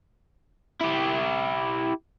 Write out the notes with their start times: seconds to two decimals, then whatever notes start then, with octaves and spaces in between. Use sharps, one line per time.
0.81 E4 G4